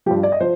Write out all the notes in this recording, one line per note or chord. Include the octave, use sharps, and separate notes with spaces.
G2 F3 G4
D5
D#5
F3 C5